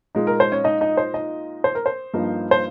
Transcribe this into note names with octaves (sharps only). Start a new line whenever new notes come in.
A#2 G#3 D#4
A#4
C5
C#4 C#5
D#4 D#5
D#4 D#5
C5
D#4 D#5
C5
A#4
C5
G2 F3 A#3 D#4
C5